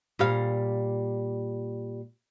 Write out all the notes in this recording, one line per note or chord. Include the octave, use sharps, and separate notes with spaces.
A#2 G3 F5